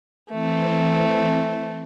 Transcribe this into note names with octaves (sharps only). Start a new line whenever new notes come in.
E3 A3 C4